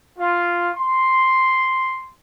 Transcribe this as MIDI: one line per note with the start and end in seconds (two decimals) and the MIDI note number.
0.18 0.70 65
0.75 2.09 84